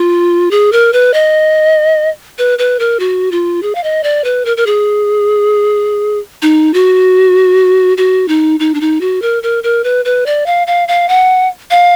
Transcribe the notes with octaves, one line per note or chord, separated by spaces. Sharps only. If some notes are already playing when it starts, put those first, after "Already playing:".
Already playing: F4
G#4
A#4
B4
D#5
B4
B4
A#4
F#4
F4
G#4
F5
D#5
D5
B4
A#4
A#4
G#4
D#4
F#4
F#4
D#4
D#4
D4
D#4
F#4
A#4
A#4
A#4
B4
B4
D5
F5
F5
F5
F#5
F5